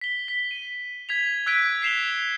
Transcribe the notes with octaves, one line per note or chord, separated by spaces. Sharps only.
B6 G7
B6
D#7
G#6 B6 F7
E6 F#6 G#6 B6 D7 D#7
B6 C7 E7 F7 G7